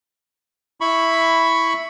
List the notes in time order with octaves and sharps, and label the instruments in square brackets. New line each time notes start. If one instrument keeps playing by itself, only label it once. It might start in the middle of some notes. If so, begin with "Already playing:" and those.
[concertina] E4 B5 C#6